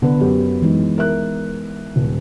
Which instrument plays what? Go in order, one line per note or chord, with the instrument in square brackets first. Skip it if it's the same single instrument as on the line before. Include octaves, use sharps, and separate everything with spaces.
[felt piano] D3 [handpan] B3 B4
[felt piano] F#2 G4
[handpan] E3 G#3 D#4
[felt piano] A#4 E5 F#6
D#1